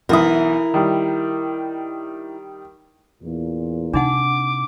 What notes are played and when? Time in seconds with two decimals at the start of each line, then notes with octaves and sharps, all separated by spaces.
0.09 B1 E3 E4 A#4 D#6
0.74 D#3 G3
3.23 E2 A#2
3.94 C3 D4 D#4 F#5 D6